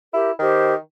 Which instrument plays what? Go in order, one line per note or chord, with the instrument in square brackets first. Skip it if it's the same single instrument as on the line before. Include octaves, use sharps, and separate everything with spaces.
[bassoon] E4 [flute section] G4 A#4
[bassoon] D#3 [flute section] G4 C5